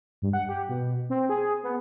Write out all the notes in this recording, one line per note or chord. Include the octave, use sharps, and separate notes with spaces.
G2
F#5
G4
B2
C4
G#4
B3